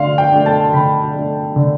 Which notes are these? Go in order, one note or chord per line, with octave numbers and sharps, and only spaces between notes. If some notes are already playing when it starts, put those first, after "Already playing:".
Already playing: D3 A3 F5 C6
G5
A3 D4
A5
D3 B5
A3 D4
D3